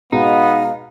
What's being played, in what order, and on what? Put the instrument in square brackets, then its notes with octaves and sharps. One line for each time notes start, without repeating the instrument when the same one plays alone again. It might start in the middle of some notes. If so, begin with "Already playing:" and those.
[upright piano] B2 G#3 [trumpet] B3 [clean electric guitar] D#4 [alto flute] F5